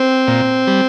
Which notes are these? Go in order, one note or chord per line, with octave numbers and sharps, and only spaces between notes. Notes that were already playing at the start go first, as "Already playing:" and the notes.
Already playing: C4
A#2
G3